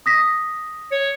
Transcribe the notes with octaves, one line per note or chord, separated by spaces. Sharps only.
D#6 A#6 B6
C#5